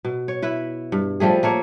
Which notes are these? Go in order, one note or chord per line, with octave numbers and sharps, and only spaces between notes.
B2
C#5
E4 B4
G2
F3 G3 A3 G#4
A3 A#3 C#5